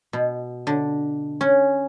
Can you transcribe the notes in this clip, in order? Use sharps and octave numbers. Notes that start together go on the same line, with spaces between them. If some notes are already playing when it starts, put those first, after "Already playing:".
B2
D3
C#4